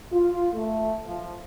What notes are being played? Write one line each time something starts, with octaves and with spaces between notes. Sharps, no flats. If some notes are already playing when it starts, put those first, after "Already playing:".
F4
A3
F3